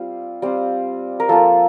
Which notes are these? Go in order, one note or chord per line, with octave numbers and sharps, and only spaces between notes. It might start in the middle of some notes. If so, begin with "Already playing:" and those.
Already playing: G3 C4 F4
G3 C4 F4
A#4
F3 A#3 F4 A4